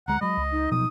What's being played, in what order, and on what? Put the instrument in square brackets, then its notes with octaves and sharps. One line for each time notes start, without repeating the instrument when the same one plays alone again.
[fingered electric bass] D2 G#3 [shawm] F#5 [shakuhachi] A#5
[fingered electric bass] F#3 G#3 [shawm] D#5 [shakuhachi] B5
[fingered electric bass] C#2
[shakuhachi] D#4
[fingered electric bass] B2 F3 F#3 [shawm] D#6